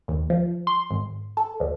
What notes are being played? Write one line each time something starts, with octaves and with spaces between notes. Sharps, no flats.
D#2
F3
C6
G#1
A4
D2